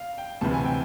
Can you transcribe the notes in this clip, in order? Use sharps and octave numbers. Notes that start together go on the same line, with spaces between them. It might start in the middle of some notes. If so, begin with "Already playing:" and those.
Already playing: F5
G5
D2 C3 E3 G3 A5
G#5
G5